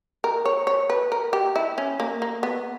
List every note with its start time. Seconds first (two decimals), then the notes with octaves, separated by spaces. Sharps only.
0.24 A#4
0.45 C#5
0.67 C#5
0.90 B4
1.12 A#4
1.33 G4
1.56 E4
1.78 C#4
2.00 A#3
2.22 A#3
2.43 B3